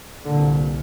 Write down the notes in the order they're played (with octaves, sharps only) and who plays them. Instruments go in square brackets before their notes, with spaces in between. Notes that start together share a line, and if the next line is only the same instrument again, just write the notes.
[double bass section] C2 A#2 D3